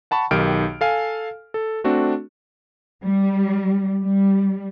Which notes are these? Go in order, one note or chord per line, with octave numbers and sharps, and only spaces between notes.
F#5 A5 B5 C#6
B1 D#3 G4 F6 D7
A4 F5 G#5
A4
A3 C4 D4 F#4
G3
G3